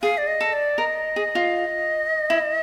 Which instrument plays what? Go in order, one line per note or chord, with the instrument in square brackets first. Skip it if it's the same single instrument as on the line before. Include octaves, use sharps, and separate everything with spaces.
[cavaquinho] G#4 [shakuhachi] F5
[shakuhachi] D5
D#5
[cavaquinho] A4
[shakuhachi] D5
[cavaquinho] A#4 [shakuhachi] D#5
[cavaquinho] G#4
F4
E4